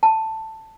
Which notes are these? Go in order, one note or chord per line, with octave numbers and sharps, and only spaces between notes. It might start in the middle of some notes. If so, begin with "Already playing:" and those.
A5